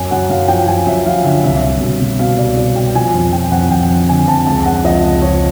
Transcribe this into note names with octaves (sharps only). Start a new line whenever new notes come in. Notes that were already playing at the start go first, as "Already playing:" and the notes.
Already playing: F#2 G#5
F#2 F#5
F#2 F5
F3 G5
F3 G#5
F#2 E5
F3 F5
D3 E5
C2 E5
C2
B2
B2
B2 F5
C2 D5
B2 D5
B2 G5
F3 G#5
F2
F3 G5
F2 F#5
F2 G5
F2
D3 G#5
F2 A5
C#2 A5
C#2 F#5
F3 D#5
C#2
F3 C#5